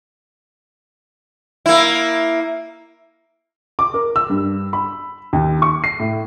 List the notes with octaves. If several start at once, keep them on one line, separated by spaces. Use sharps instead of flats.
A#3 E4
D6
A#4
E6
G2
B5
D#2
C#6
C7
A2